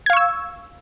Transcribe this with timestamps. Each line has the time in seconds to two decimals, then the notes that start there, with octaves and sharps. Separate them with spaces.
0.06 G#6
0.10 F5
0.13 C#6
0.17 E6